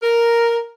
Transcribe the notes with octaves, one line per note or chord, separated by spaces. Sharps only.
A#4